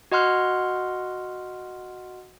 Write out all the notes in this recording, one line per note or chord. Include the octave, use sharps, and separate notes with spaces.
F#4 D#5 F#5 C6 F6 F#6